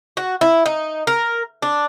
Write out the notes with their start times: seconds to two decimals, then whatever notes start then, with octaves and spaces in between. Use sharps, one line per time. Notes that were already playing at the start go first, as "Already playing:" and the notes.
0.17 F#4
0.41 E4
0.66 D#4
1.07 A#4
1.62 D4